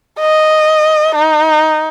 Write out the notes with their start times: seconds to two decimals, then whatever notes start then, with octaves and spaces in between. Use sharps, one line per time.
0.20 D#5
1.15 D#4